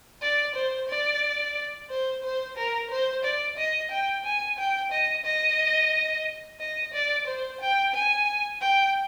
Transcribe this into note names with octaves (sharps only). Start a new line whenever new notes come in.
D5
C5
D5
C5
C5
A#4
C5
D5
D#5
G5
G#5
G5
D#5
D#5
D#5
D5
C5
G5
G#5
G5